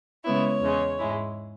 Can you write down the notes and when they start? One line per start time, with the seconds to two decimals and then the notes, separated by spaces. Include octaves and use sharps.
0.24 C#3 G#3 B3 E4 C#5
0.61 E2 C#3 G#3
0.98 G#2 G#3 E4